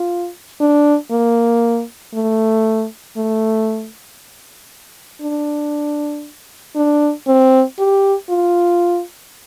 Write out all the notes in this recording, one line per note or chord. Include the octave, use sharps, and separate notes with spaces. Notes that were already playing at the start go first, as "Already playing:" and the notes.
Already playing: F4
D4
A#3
A3
A3
D4
D4
C4
G4
F4